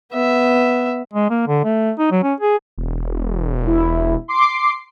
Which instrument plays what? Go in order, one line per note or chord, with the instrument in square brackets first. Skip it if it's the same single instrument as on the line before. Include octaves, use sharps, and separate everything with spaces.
[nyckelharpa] B3 E5
[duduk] G#3
A#3
D3
A3
D#4
F#3
C#4
G#4
[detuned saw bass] E1
[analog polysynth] E4
C6 D6 C7